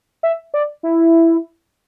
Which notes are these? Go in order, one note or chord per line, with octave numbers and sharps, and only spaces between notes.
E5
D5
E4